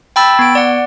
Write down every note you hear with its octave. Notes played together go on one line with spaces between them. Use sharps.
G5 A5 B5 E6 A6
B3 D7
D5 F#5